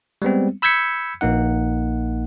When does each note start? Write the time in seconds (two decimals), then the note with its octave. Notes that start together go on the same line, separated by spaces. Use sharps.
0.22 G3 G#3 B3 C4
0.62 B5 E6 G6 G#6 B6 C#7
1.21 A#1 A#3 D#4 F#5